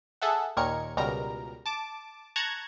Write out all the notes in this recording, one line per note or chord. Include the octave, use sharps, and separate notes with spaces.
G#4 A4 E5 F#5
D#2 A#2 D#3 A#4 G#6 C#7
C#2 B2 G3 A#4 A#5
A5 D6
A5 A#5 C#6 F#6 G#6